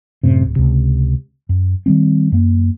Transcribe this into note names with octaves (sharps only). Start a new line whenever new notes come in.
F#2 A2 C3
D1
C#2 C3
F#2
D#3 G3 C4
F#2 A#3